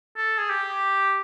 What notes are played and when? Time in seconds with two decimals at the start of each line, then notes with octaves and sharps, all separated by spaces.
0.17 A4
0.38 G#4
0.49 G4